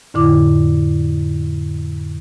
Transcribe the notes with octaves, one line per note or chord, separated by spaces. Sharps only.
F2 A2 D3 E4 D6